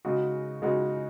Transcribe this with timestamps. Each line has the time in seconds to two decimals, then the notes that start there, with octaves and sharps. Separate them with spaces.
0.05 C#3 G#3 D#4 F#4
0.62 C#3 G#3 D#4 F#4